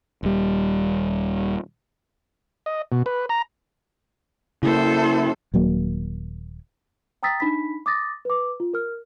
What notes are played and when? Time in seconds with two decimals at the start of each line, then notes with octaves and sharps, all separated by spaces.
0.23 D#1 G3
2.66 D#5
2.92 B2
3.06 B4
3.29 A#5
4.63 C#3 A#3 E4 A4 C5
5.54 D#1 F#3 A#3
7.23 G5 A#5 D#6 E6 A6 B6
7.40 D4 D#4 B5 B6
7.86 D6 D#6 A6 A#6
8.25 B4 D6
8.60 F4
8.74 A#4 F6